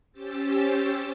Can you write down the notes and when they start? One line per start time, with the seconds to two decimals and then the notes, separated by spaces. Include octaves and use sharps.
0.12 C#4 G4 C5 E6 A6